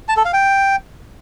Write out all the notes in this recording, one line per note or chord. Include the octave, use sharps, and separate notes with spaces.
A5
A4
F5
G5